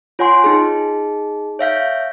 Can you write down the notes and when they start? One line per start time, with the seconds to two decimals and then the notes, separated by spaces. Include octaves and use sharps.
0.19 F4 C#5 F#5 G#5 C6
0.44 D#4 G#4
1.59 C#5 E5 F5 G6